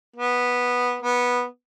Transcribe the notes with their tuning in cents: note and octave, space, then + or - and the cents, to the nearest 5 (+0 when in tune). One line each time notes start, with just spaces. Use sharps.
B3 -5
B3 -10